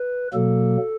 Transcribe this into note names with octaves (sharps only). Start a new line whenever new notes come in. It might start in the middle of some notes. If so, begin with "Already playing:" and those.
Already playing: B4
B2 F#3 A#3 A4